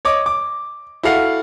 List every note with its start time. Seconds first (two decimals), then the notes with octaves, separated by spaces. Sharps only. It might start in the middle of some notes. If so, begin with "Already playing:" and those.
0.05 C#5 D#5 D6
0.26 D6
1.03 E4 F#4 A4 F5 F#5